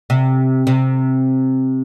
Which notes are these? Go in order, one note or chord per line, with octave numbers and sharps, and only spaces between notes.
C3
C3